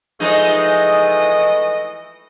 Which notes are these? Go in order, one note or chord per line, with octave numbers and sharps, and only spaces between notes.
E3 F3 G#3 A3 D#4 D#5